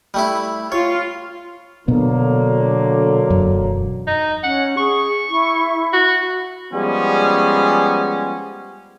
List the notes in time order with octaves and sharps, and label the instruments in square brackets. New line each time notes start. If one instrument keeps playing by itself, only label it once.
[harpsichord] G3 A3 E4
[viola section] F4 [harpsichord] C#5
[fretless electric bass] B2 B3 [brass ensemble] D3 F#3 A#3
[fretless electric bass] E1 F#2
[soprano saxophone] D#4
[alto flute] C#4 [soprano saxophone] F#5
[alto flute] G#4 [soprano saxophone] C#6
[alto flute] E4
[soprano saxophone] F#4
[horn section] F3 G3 G#3 B3 C#4